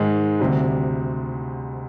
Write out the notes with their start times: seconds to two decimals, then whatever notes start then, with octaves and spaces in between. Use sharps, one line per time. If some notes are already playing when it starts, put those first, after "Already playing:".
Already playing: G#2 D#3 G#3
0.40 D2 C3 G3